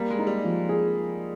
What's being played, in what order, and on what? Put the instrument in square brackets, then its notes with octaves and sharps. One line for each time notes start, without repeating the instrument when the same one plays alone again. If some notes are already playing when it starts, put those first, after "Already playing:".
Already playing: [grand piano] G3 [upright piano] A#3
[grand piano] G#3
[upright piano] D#4
[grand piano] G3
[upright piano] F3
G#4